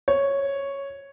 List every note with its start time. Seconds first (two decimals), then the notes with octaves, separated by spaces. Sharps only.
0.08 C#5